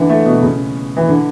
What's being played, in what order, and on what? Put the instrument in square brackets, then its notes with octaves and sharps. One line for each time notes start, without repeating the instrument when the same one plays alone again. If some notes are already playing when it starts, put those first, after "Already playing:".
Already playing: [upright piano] D3 E3
A3
B2
C#3
E3
D3